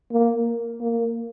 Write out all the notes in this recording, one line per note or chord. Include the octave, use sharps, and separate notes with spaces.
A#3
A#3